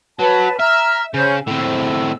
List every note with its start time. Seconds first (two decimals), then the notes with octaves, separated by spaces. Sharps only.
0.19 F#3 B4 A5
0.59 E5 A#5 F6
1.14 C#3 C#4 C5 G6
1.47 A2 C4 E6